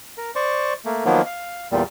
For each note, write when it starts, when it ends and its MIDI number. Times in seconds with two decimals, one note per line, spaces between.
0.18 0.31 70
0.35 0.73 72
0.35 0.73 74
0.35 0.73 85
0.85 1.04 57
0.85 1.04 58
1.05 1.21 51
1.05 1.21 53
1.05 1.21 54
1.05 1.21 58
1.05 1.21 59
1.26 1.67 77
1.71 1.83 40
1.71 1.83 46
1.71 1.83 55